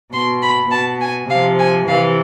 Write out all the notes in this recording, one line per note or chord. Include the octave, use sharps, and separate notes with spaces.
B2 C6
B5
B2 A5
G#5
C3 F3 F5
G#5
C3 E3 F5